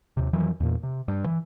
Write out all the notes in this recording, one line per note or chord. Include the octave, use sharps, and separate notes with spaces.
D#2 C3
F2 D#3 E3 F#3
E2 A#2
C3
G2
E3